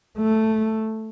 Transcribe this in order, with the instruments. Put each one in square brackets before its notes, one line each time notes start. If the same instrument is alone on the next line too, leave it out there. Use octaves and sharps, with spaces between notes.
[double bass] A3